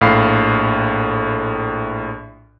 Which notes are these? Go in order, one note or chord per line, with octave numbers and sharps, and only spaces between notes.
A#1 A2 F5 B5 C7